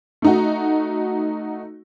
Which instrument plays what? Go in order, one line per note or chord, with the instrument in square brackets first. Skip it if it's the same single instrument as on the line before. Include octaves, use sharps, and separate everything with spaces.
[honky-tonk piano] A3 D#4 F#4